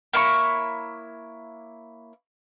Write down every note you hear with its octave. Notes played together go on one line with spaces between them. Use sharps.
A#3 E4 C#5 C#6